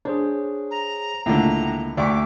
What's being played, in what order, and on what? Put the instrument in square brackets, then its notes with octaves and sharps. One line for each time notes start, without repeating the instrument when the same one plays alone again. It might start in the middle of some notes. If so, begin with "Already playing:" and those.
[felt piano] D4 [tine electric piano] G#4 C5 C#5
[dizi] A#5
[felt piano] C#2 [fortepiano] A2 D3 [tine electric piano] A#3 [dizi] A#5
[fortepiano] D2 [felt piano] D5 C#6 B6 [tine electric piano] G5 [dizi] D6